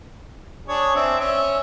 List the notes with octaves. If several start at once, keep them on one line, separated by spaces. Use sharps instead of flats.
D4 G#4 C#5
C4 D4 E5
C#4 E5